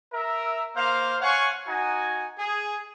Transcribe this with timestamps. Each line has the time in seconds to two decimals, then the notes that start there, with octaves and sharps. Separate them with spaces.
0.13 A#4 E5
0.77 A#3 C5 F5
1.21 C#5 F5 F#5 G#5 C#6
1.67 D#4 F#4 G#5
2.37 G#4